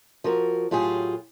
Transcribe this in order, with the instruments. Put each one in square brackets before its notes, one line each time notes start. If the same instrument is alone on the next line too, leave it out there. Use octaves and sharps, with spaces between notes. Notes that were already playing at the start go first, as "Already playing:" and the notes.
[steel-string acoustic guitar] F3 F#4 A#4
A2 F#3 F4 G4 G#4